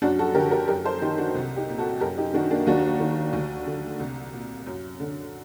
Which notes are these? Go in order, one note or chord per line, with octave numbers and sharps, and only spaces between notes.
F#2 D4 F#4
F#4 A4
D3 G4 A#4
G4 A#4
F#2 G4 A#4
A4 C5
D#3 D#4 G4
D4 F#4
C2
D#4 G4
A#2
F#4 A4
F#2 G4 A#4
D#4 G4
D#3 D4 F#4
A#3 D4
D#2 D4 F#4
D#3
D2
D3
C2
A#2
F#2
D3